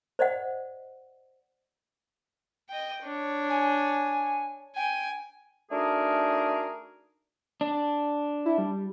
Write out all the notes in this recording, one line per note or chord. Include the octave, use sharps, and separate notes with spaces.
C5 D5 D#5 F#5
D#5 G5
D4 C#5
G#5
G5 G#5
A3 D4 D#4 F#4 G#4 A#4
D4
E4
G3